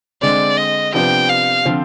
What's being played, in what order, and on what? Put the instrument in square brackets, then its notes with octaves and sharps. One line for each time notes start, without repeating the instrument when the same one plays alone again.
[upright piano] D3 G#3 C4 [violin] D5
[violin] D#5
[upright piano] C3 F3 B3 D4 [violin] G5
[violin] F5
[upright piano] D3 F3 C4 F4 C5